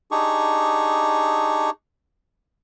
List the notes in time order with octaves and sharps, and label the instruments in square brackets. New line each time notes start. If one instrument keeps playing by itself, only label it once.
[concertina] D4 D#4 G4 G#4 C#6